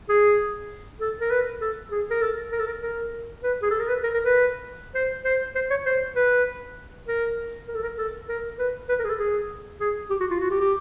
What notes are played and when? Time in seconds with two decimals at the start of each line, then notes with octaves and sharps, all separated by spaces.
0.09 G#4
1.00 A4
1.20 A#4
1.31 B4
1.61 A4
1.91 G#4
2.10 A#4
2.22 A4
2.52 A#4
2.60 A4
2.67 A#4
2.82 A#4
3.43 B4
3.62 G#4
3.71 A4
3.80 A#4
3.88 B4
4.03 A#4
4.14 A#4
4.24 B4
4.94 C5
5.25 C5
5.55 C5
5.70 C#5
5.86 C5
6.16 B4
7.07 A#4
7.68 A#4
7.74 A4
7.82 A#4
7.98 A4
8.28 A#4
8.59 B4
8.89 B4
8.99 A#4
9.05 G#4
9.09 A4
9.19 G#4
9.80 G#4
10.10 G4
10.20 F#4
10.31 F4
10.40 F#4
10.51 G4
10.61 G4